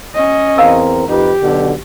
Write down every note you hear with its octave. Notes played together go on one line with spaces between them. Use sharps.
C#4 D#5
E2 C4 A#4 F5 E6
F2 D#4 G4 B4
B1 B2 D3